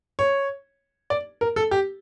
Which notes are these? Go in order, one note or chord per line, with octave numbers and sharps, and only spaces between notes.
C#5
D5
A#4
A4
G4